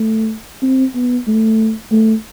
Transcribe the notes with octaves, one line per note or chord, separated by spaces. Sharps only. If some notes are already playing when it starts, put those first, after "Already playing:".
Already playing: A3
C4
B3
A3
A3